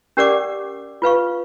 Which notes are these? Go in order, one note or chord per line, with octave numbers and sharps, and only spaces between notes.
C#4 G4 A#4 D5 F#5 D6
F4 B4 F5 C#6